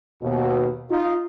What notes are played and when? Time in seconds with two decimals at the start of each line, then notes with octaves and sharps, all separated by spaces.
0.22 D#2 B2
0.90 D#4 F4